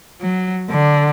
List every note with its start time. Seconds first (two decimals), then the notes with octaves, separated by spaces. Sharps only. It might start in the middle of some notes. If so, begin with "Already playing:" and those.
0.21 F#3
0.70 D3